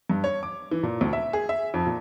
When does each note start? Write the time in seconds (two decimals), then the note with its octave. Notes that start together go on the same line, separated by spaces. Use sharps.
0.10 G2
0.24 C#5
0.43 D6
0.72 E3
0.83 A#2
1.01 D2
1.13 E5
1.33 G#4
1.49 E5
1.74 F2
1.87 A#2